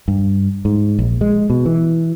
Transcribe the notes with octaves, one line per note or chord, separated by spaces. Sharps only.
G2
G#2
A#1
G#3
B2
E3